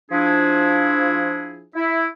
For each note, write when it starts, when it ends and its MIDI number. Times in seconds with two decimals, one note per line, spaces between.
0.11 1.65 53
0.11 1.65 62
0.11 1.65 64
0.11 1.65 68
1.76 2.07 64